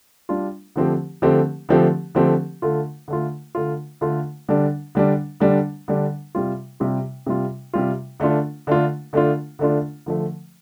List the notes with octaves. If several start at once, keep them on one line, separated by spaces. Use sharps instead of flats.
G3 D4 F4
D3 F3 A3 C4 G4
D3 F3 A3 C4 G4
D3 F3 A3 C4 G4
D3 F3 A3 C4 G4
D3 A3 F4
D3 A3 F4
D3 A3 F4
D3 A3 F4
D3 G3 D4
D3 G3 D4
D3 G3 D4
D3 G3 D4
C3 G3 F4
C3 G3 F4
C3 G3 F4
C3 G3 F4
D3 A3 D4 F4
D3 A3 D4 F4
D3 A3 D4 F4
D3 A3 D4 F4
D3 F3 A3